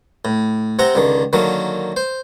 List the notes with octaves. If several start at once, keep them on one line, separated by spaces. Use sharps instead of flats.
A2
C3 C4 F#5 A#5
C#2 D3 D#3
D3 D#3 F#3 A#3
C5